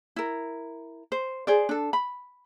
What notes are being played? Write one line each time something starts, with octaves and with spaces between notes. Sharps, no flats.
E4 A#4
C5
G#4 C5 D5
D4 A4
B5